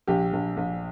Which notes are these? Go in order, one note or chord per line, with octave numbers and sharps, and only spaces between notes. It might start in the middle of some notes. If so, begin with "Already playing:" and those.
A#1 G4
A#1
A#1